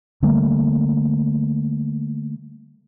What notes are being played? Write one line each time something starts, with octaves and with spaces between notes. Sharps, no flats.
D3 G3 A3 A#3